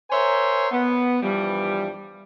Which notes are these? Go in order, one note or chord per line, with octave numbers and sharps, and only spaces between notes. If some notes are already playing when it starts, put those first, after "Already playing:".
A#4 C5 C#5 E5 G#5 C6
B3
G2 E3 F3 G3